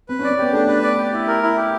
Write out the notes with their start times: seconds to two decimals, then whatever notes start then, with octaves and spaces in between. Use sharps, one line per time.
0.09 C4 B4
0.19 C#4
0.24 D5
0.31 C#4
0.38 B3 G4
0.53 A3 D4
0.68 B4
0.83 D5
0.98 G4
1.13 E4
1.27 A#4
1.43 E4
1.57 G4